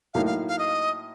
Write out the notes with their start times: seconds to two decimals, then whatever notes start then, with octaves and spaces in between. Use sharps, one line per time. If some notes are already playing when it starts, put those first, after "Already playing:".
0.14 A2 F#3 A#3 D#4 F5
0.26 F5
0.48 F5
0.59 D#5